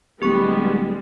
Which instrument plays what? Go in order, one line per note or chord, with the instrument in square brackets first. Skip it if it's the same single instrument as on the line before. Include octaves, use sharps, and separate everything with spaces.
[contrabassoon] D1 [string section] G3 G#3 [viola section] B3 [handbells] G4 C#6